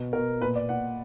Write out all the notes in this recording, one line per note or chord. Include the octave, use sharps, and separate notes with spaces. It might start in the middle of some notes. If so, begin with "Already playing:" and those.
Already playing: B2
B2 A#4
A#2 B4
D5
A#2 F#5